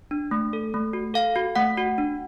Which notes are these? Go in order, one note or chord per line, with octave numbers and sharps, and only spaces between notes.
D4
A3
A4
A3
F#4
A4 F5
F#4
A3 F#5
F#4
D4